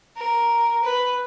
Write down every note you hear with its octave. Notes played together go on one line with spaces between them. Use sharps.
A#4
B4